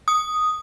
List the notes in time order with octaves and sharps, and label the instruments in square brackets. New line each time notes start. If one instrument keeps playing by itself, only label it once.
[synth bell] D#6